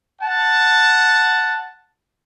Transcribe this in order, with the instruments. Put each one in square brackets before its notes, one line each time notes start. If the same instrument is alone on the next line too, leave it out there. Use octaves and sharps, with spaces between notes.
[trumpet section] F#5 A5